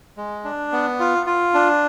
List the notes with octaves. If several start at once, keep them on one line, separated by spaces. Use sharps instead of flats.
G#3
D4
B3
F4
F4
D4